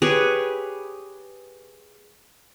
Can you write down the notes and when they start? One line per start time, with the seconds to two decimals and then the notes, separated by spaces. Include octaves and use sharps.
0.02 G4 G#4 B4 C#5